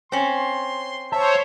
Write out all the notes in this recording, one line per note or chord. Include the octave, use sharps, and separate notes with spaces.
C4 C#4 C6
C5 C#5 E5 A5